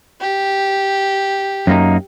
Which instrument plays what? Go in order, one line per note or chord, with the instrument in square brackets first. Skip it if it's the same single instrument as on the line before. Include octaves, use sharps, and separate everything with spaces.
[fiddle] G4
[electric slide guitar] F#2 A#3 D#4